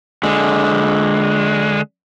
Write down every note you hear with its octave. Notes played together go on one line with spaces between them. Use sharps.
D3 G#3